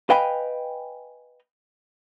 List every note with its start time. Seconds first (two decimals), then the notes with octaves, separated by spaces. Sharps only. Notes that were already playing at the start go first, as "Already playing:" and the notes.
0.10 B4 D#5 F5 G5 G#5 B5